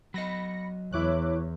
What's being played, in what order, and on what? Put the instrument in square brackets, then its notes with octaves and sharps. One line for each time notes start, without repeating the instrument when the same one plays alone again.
[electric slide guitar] F#3 D#5 [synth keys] B5 A#6 C#7
[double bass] E2 [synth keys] E4 D6 F#6 [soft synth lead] C#5